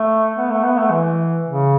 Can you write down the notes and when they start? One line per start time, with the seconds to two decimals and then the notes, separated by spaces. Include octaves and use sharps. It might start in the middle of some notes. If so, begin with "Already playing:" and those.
Already playing: A3
0.37 B3
0.50 A3
0.64 B3
0.78 A3
0.91 E3
1.44 C#3